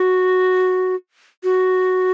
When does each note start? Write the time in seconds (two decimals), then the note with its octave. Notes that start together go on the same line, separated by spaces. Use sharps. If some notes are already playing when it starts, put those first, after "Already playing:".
Already playing: F#4
1.44 F#4